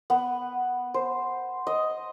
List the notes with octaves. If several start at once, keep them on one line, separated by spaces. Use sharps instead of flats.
B3
C5
D#5